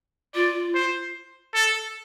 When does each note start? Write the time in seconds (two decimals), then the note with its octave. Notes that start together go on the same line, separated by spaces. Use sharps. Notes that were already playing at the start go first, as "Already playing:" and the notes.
0.35 F4 D5
0.75 C5
1.54 A4